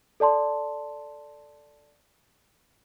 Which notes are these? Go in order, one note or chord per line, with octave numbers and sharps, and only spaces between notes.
A4 D5 A5 C6